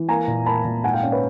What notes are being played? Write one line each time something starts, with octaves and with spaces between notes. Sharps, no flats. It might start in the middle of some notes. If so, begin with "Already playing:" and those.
Already playing: E3
A#3 G#5 A#5
A#2
A#3 A5 B5
A#2
G#2 F#5 G#5
F5 G5
C#4
B4 C#5